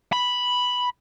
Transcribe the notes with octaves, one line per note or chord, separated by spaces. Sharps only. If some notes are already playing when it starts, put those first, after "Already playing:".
B5